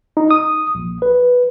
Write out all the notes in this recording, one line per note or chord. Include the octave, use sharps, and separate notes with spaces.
D#4
D#6
A#1
B4